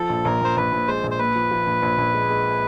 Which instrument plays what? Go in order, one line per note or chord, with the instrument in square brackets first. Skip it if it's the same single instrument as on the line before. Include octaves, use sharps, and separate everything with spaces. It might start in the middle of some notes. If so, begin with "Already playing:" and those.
Already playing: [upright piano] F3 [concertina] A4
[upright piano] A#1
[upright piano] A#1 [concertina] A#4
[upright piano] A#1 [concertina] C5
[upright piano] A#1 [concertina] B4
[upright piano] A#1
[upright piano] G#3 [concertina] C5
[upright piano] A#1
[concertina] C5
[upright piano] A#2 [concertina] B4
[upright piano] F3
F3
A#1
A#1
A#1
G#3
G#3